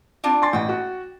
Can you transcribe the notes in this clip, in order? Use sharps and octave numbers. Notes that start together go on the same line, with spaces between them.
C4 D4 F4
G#5 C6 A6
A1 F#5 G5
F#4